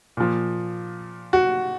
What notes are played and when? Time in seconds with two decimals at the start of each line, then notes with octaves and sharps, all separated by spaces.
0.17 A#2 F3
1.33 F#4